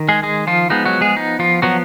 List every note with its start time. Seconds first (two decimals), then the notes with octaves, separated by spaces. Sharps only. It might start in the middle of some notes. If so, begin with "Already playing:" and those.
Already playing: D#3
0.09 G#3 G#4
0.23 G#3 G#4
0.47 F3 F4
0.70 F3 G#3 B3 D#4
0.86 F#3 F#4
1.01 G#3 G#4
1.16 D#4
1.39 F3 F4
1.62 F3 F#3 B3 F#4